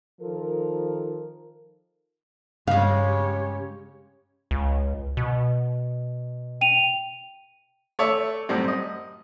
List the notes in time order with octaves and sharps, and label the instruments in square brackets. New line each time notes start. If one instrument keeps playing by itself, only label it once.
[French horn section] D#3 F3 A4 A#4
[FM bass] G2 [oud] C#3 G#3 [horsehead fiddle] G4 C#5 [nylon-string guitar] F5
[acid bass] C#2
B2
[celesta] G5 D#7 F7
[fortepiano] A3 C#5 D5 E5
F#2 A2 G3 C4
D#5